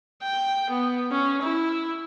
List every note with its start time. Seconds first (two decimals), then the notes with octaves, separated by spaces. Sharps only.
0.22 G5
0.70 B3
1.11 C#4
1.42 E4